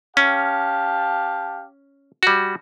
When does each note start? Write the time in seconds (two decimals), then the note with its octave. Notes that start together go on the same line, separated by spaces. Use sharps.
0.17 C#4 G4 F5 A5
2.23 G3 F#4